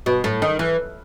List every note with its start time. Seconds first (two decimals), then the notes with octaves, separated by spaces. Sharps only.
0.06 B2
0.24 A2
0.42 D#3
0.59 E3